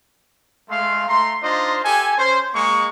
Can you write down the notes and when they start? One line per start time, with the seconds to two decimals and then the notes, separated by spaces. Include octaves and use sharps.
0.70 G#3 A3 F5 C6
1.08 A3 A#5 C6
1.42 D4 D#4 F4 C5 D#5
1.84 G4 A4 G#5
2.18 C#4 C5
2.54 G#3 A#3 C#6